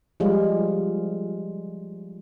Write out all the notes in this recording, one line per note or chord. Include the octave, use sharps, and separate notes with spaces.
F3 G3 G#3 F4